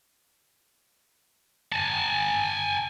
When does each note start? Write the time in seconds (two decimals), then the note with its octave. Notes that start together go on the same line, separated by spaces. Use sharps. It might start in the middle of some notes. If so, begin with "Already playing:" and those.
1.72 G#5 A5